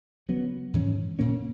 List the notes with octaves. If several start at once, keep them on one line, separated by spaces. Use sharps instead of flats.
C#3 F#3 B3
G#2 E3 G#3 C#4
A#2 A#3 C#4